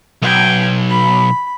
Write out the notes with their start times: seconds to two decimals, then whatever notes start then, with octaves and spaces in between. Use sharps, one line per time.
0.22 B1 G5 G#5
0.90 B5